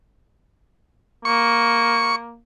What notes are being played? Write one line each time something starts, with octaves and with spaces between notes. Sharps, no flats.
A#3 C#6